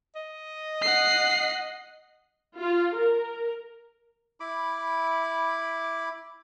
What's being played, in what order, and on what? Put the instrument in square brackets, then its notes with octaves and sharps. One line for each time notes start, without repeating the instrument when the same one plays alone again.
[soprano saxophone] D#5
[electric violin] F#5 C7
[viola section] F4
A#4
[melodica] E4 B5 D6